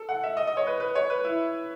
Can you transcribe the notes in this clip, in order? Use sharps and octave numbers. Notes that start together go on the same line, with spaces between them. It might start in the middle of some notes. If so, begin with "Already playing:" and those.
Already playing: A4
F#5
E5
D#5
D#5
C#5
B4
B4
C#5
B4
E4